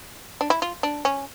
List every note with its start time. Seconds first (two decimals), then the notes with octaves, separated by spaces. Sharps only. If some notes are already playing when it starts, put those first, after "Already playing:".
0.41 D4
0.50 E4
0.62 F4
0.83 D4
1.05 C#4